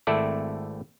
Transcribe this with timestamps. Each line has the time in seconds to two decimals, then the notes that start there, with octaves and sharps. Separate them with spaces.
0.07 G#1 A3 C4 E4 A4 D5